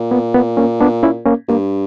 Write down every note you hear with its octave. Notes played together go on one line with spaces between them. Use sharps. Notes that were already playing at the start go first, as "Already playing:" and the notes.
Already playing: A#2
B3
B3
A#3 C#4
B3 D4
C#4 E4
A#3 C#4
G2 A#3